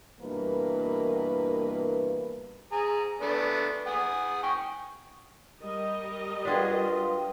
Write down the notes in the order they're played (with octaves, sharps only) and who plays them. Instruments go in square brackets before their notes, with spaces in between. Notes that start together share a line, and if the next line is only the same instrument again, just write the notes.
[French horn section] G2 B2 E3 A#3 A#4 B4
[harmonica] G#4 A#5
A3 B3 D4
F#5 G#5 D#6
G5 G#5 C#6
[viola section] G3 A#4 D#5
[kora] D4 F#4 G#4 [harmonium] F4 [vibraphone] B4 G5